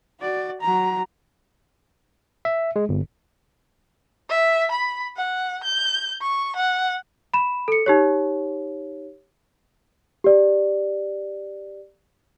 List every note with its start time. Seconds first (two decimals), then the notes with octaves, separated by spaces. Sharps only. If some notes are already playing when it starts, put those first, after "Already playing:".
0.20 F#4 D5
0.61 F#3 A#5
2.45 E5
2.76 G#3
2.89 G1
4.30 E5
4.72 B5
5.17 F#5
5.63 G6
6.22 C#6
6.56 F#5
7.34 B5 E7
7.68 A4 C#7
7.86 D#4 G4 C#5
10.24 G4 D5